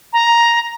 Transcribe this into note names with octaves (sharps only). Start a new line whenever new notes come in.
A#5